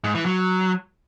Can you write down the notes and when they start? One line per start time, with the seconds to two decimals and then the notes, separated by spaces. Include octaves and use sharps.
0.04 G#2
0.15 E3
0.26 F#3